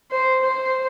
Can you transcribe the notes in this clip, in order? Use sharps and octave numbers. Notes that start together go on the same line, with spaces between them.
C5
C5